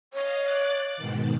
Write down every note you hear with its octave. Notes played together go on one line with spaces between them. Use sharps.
C#5 D#5 F5
D6 F#6 A6
G#2 B2 D#3